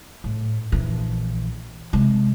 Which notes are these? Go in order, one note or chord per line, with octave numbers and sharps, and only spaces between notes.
A2
A#1 E3
C3 G#3